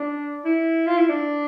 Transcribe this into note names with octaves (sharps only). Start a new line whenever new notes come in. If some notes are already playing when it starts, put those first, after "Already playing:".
Already playing: D4
E4
F4
E4
D4